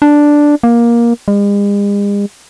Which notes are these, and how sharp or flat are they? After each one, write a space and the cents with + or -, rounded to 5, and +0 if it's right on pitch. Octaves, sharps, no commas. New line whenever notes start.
D4 +0
A#3 +15
G#3 -45